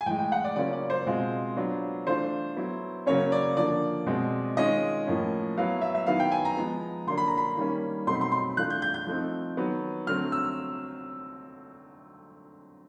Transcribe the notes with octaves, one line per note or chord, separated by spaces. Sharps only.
G#5
A2 E3 G#3 G5
G5
F#5
D5
C#3 F#3 A#3 C#4 F4 D5
D5
C5
B2 G#3 C4 F4
F#3 B3 D4 F4
E3 A3 D4 F4 C5
F#3 B3 E4
C#3 F#3 A#3 C#4 C#5
D5
D3 F3 A#3 D5
B2 G#3 C4
D#3 G#3 C#4 F4 D#5
A2 F3 A#3 C#4
F#3 B3 E4 F5
E5
E5
D#3 F#3 B3 E4 F5
G5
G#5
A#5
F3 G#3 B3
D3 F#3 A#3 D4 C6
B5
A#5
B5
D#3 G3 A#3 C#4
B2 F#3 A3 C4 D#4 C6
B5
C6
C6
E3 A3 D4 F4 F#6
G6
G6
G6
F3 A3 C4 D#4
D#3 F#3 B3
D3 F#3 A3 C4 F6
E6